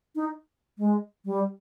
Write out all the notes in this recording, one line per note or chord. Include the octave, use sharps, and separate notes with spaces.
D#4
G#3
G3